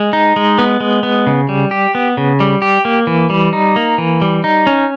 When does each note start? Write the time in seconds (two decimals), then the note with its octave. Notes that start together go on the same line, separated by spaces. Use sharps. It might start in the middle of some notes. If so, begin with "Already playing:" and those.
Already playing: G#3
0.13 D#4
0.36 G#3
0.58 B3
0.80 G#3
1.03 B3
1.27 C#3
1.49 G3
1.71 G4
1.95 B3
2.17 C#3
2.40 G3
2.62 G4
2.85 A#3
3.07 E3
3.30 G3
3.53 D#4
3.76 A#3
3.98 E3
4.22 G3
4.44 D#4
4.67 C#4